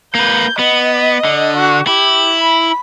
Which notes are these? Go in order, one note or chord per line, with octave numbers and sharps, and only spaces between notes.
A#3 B4 G6
B3 D#5
D3
F#4
E4 G4
B5